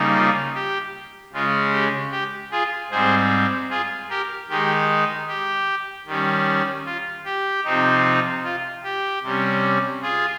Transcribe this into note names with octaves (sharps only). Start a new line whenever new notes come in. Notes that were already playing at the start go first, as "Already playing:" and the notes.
Already playing: C#3 G3 A#3 D#4
F4
G4
C#3 G#3 C#4 F4
G4
G4
F4 G#4
G#2 G3 C4 G#4 C5
F4 G#4
G4 A#4
D#3 G#3 D#4 G4
G4
D#3 G3 C#4
F4
G4
C3 F3 C4 D#4
F4
G4
C3 G3 C#4
F4 G#4